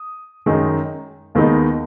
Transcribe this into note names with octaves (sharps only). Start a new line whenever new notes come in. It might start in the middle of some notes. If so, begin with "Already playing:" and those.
Already playing: D#6
F#2 D#3 G#3 D#4
D#2 D#3 G#3 B3 D#4